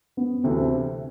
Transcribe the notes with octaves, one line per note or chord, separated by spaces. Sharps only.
B3
D2 C3 E3 A3 C4